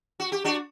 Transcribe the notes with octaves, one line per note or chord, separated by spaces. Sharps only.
F#4
G4
D4 F#4